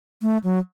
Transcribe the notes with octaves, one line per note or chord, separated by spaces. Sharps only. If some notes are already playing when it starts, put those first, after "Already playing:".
A3
F#3